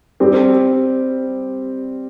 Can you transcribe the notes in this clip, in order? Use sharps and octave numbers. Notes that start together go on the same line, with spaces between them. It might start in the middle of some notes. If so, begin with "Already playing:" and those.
G3 C4 G4